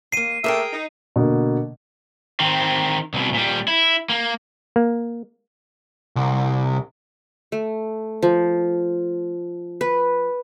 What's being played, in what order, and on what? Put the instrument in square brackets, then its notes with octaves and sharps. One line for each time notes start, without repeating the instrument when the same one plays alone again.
[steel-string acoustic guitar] D#2 A#3 [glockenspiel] C7 D#7
[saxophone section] A3 A#3 E5 [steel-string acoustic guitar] G#4 A#4 G5
[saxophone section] D#4
[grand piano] B2 D3 A#3
[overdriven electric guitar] D#3 C4
C2 B2
A#2 G3
E4
A#3
[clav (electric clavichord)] A#3
[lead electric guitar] C2
[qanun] A3
F3
B4